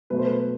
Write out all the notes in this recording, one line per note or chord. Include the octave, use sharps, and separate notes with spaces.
B2 F#3 A3 B4
C5
B4